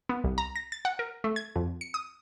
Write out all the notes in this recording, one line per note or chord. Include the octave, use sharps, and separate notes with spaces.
B3
C2
A#5
A#6
A6
F#5
A#4
A3
G#6
F2
C#7
D#6